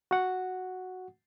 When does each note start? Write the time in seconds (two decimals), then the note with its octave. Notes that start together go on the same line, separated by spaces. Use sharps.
0.11 F#4 F#5